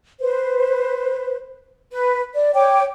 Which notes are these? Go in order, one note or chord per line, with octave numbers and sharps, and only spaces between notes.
B4 C5
B4
D5
C#5 G5 D6